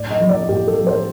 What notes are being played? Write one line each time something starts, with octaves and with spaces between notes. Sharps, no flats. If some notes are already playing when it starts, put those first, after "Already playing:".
Already playing: A2 D5
D#5
F3
D5
A2 G4
A4
F3
C5